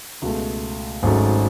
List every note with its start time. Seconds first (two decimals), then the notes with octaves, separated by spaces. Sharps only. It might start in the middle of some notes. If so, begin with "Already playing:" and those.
0.22 C#2 B2 A3
1.03 G#1 G#2 F#3 A3 C#4